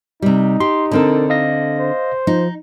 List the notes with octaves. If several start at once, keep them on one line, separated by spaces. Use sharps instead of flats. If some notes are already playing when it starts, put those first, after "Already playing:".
C3 G3 D#4
G4 C6
D3 C4 D4 A4 A#4
D#5 F5 A#6
C5
F3 D#4